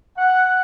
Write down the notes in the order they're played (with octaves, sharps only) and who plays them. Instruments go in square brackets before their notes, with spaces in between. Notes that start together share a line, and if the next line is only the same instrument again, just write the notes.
[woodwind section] F#5